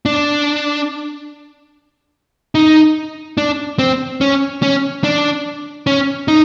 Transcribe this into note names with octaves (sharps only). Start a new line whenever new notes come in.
D4
D#4
D4
C4
C#4
C#4
D4
C#4
D#4